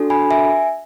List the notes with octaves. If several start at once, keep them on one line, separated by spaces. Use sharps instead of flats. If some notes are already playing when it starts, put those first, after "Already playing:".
Already playing: D4 F#4 A4
G#5 B5
E5 G#5